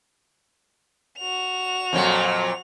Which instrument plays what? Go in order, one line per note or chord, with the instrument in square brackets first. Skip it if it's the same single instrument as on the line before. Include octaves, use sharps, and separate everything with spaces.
[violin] F#4 F7
[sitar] F2 A#2 F#3